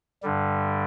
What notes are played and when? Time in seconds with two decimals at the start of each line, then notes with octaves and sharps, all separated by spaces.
0.23 G2 D3 G3